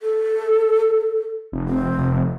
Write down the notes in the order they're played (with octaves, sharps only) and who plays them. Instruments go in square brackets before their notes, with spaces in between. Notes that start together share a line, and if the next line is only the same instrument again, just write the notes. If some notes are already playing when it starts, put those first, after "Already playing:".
[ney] A4
[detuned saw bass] F1
[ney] C4
[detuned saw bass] F1